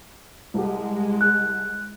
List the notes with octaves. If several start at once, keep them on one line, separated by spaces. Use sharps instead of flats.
C2 G#3 G4
F#6